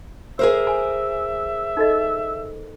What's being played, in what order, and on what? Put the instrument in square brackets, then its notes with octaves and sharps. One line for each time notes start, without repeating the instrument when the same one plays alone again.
[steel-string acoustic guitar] G#4 A#4 C5 [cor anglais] E5
[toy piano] G#5
D#4 A4 D#5